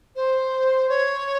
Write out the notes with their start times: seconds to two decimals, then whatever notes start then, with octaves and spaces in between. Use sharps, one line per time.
0.15 C5
0.89 C#5